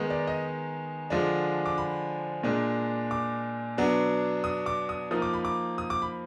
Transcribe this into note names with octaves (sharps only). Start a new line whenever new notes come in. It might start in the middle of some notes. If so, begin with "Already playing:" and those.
Already playing: D#3 G#3 B3 D#4
D5
D#5
D3 F3 G#3 D4
D6
B5
A#2 G#3 D4
D6
B2 F#3 B3 D4
D#6
D6
D#6
F3 A#3 D#4 D#6
D6
B5
D6
D#6
D6
B5